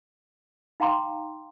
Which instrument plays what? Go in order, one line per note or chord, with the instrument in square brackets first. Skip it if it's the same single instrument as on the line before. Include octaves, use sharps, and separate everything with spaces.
[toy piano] D#4 F5 G5 A#5 C6 D6